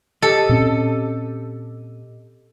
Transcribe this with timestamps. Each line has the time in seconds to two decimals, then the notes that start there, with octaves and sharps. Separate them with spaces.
0.22 G4 A4 D#5
0.49 A#2 C4 C#4